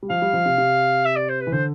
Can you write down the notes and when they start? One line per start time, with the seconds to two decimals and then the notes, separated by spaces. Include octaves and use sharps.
0.03 G3
0.10 F3 F5
0.22 G3
0.33 F3
0.45 C3
0.58 C3
1.05 E5
1.16 D5
1.29 C5
1.41 B4
1.47 E3
1.52 D3 C5